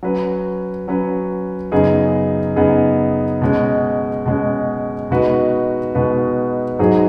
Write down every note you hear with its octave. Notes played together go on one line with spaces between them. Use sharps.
F#3 C#4 B4
F#3 C#4 B4
F#2 C#3 B3 D#4 G#4
F#2 C#3 B3 D#4 G#4
B2 G#3 C#4
B2 G#3 C#4
B2 G#3 D#4 F#4 B4
B2 G#3 D#4 F#4 B4
G#2 F#3 D#4 G#4